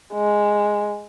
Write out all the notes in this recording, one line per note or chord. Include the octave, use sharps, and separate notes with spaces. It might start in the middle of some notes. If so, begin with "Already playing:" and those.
G#3